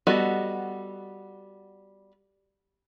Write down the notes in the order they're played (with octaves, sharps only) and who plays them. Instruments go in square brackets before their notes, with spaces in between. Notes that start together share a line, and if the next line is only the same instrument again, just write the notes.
[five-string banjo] G3 B3 F#4 A4 D#5